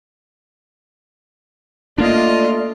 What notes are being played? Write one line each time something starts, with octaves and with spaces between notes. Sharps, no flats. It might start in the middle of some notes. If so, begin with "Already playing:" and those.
A3 A#3 D4 F4 D5 D#5